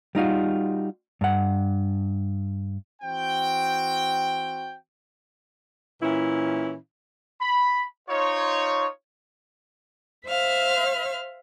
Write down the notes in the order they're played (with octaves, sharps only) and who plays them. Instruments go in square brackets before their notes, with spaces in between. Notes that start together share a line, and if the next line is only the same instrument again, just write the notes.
[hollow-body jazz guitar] G3 D#4 F4 F#4
G2 F#5
[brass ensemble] E3 C4 F#4 G5
[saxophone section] A#2 E3 C#4 E4
[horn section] B5
D#4 F4 C5 C#5
[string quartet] C5 E5 F5 F6